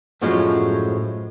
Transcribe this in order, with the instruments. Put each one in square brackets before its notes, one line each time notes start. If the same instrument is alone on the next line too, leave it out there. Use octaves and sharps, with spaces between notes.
[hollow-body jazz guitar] F#2 A2 F3 F#3 G#3 C#4